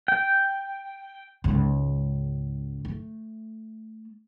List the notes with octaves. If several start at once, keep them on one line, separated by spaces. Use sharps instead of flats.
G5
C#2 G#2
A3